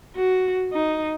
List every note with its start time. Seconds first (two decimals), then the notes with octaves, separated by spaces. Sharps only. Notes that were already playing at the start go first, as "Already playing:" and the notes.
0.16 F#4
0.73 D#4